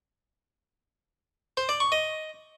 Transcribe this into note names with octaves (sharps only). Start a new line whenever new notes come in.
C5
D5
C#6
D#5